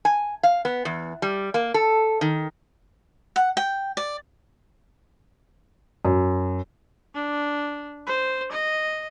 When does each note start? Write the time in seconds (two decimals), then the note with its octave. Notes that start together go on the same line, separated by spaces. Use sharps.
0.05 G#5
0.43 F5
0.65 B3
0.85 E2
1.22 G3
1.54 A#3
1.74 A4
2.21 D#3
3.36 F#5
3.57 G5
3.97 D5
6.05 F#2
7.15 D4
8.07 C5
8.52 D#5